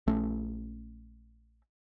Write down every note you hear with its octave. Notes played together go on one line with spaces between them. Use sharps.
A#1 A3 C#4